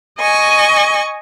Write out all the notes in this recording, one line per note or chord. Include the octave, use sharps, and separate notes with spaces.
D#5 G#5 C#6